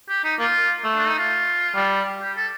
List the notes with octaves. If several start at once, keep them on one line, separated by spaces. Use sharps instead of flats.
G4
D#4
A#3 F4
A3
D4
D#4
F4
G3
G4
A4